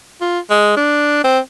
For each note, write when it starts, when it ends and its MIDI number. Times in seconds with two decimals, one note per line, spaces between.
0.21 0.39 65
0.50 0.76 56
0.77 1.20 62
1.24 1.39 60